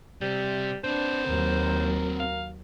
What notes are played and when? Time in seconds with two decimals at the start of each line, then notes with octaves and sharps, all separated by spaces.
0.21 C3 G3
0.84 C4 D4 B4 C5
1.28 D#2 F#3 A#4
2.20 F5